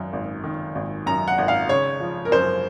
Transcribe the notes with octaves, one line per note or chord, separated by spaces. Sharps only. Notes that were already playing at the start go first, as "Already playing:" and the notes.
Already playing: G#1 F#2 D#3
G#1
D#3
G#1
F#2 A#5
F#5
G#1
F5
C#3 C#5
F3
A#4
F#2 C5